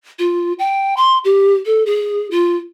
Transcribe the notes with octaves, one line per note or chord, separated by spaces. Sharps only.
F4
G5
C6
G4
A4
G#4
F4